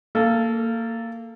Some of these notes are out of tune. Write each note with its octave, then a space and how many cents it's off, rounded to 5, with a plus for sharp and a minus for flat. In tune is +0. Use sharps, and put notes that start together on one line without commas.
A#3 -20 A4 +0